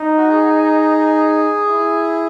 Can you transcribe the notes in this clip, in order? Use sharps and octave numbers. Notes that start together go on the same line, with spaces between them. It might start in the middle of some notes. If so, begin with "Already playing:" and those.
Already playing: D#4
F#4
G#4
E4